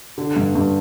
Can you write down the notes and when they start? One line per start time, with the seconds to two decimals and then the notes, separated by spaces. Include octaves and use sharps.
0.18 D3
0.36 G2
0.55 G2